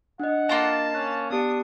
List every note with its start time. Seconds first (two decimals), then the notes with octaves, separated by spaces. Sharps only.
0.20 D4 D#5 F#5
0.49 A#3 F4 A5 A#5
0.94 C#4 F#6
1.30 B3 D4 G4 D#6 C#7